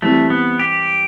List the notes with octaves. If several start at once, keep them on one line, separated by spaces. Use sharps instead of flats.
E3 G3 A3 C4
B3
G4